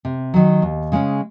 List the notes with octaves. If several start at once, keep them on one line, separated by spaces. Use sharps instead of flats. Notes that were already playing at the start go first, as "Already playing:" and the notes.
C3
D#3 F#3
D#2
C#3 G#3 C#4